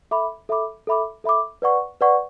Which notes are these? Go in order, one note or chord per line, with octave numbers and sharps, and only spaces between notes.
A4 E5 B5 D6
A4 E5 B5 D6
A4 E5 B5 D6
A4 E5 B5 D6
B4 D5 F#5 C#6
B4 D5 F#5 C#6